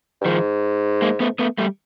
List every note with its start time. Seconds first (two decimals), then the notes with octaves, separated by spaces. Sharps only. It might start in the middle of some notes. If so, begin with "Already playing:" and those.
0.21 G2
0.25 G#2 D#3 F3
1.02 G#3 A#3
1.20 A3 B3
1.39 A3 B3
1.58 G3 A3